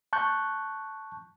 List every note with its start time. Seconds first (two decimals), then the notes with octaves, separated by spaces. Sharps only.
0.13 A5 C#6 F#6 G6